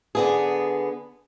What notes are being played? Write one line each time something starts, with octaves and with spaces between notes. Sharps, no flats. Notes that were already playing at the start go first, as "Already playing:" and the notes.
D3 B3 G#4